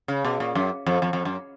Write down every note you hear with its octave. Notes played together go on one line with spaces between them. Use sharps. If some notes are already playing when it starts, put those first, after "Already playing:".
C#3
B2
A#2
F#2
F2
F2
F2
F#2